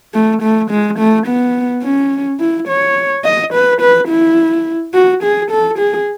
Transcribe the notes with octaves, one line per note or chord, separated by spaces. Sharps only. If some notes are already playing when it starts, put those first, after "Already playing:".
A3
A3
G#3
A3
B3
C#4
E4
C#5
D#5
B4
B4
E4
F#4
G#4
A4
G#4